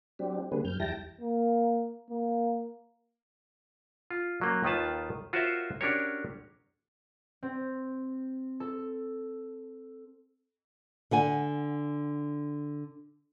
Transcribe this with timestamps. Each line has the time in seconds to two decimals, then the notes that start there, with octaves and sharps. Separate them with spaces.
0.19 F#3 C4 D4 G4
0.52 D3 G3 A#3 C4 G#4 B4
0.65 F#2 F6 G6
0.80 E2 G3 E4 G5 A5 A#6
1.21 A#3
2.10 A#3
4.11 F4
4.41 F#3 A#3 C#4
4.64 D#2 D#3 F4 B4 A5
5.33 F4 F#4 A#4 C5 C#5 E5
5.81 C#4 D4 F#4 G4 A#4 C#5
7.43 C4
8.60 A4
11.11 D3 F#5 G#5